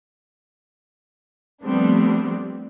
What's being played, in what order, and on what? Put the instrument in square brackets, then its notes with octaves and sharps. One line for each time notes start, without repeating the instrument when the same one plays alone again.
[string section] F3 G3 A3 B3 C4 D4